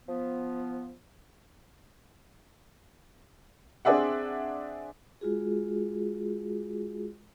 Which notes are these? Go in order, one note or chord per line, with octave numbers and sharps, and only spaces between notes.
F3 B3
C4 D4 G#4 D5 E5 F#5
G#3 F4 F#4 G#4